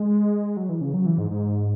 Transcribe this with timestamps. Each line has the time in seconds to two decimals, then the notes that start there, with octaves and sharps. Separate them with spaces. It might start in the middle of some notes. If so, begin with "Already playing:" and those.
Already playing: G#3
0.57 F#3
0.69 E3
0.81 C#3
0.94 F#3
1.06 E3
1.18 G#2
1.31 G#2